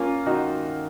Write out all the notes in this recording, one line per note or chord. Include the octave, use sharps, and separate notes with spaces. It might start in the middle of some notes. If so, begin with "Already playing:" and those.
Already playing: A#3 C#4 F4
D#3 D#4 F#4